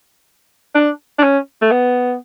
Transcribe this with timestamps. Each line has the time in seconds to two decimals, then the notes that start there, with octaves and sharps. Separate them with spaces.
0.75 D4
1.18 D4
1.23 C#4
1.62 A3
1.71 B3